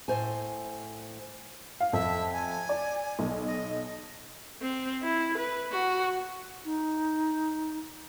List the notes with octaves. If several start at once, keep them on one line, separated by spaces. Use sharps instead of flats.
A2 C5 G#5
F5
F2 E5
G#5
D5
B1
D#5
C4
E4
B4
F#4
D#4